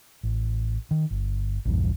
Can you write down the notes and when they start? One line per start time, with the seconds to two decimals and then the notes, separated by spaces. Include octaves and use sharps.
0.23 A1
0.91 D#3
1.10 G1
1.65 A#1 E2 G2